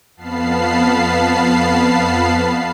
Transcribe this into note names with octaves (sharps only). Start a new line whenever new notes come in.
F2 B3 F5 A5 B5 C7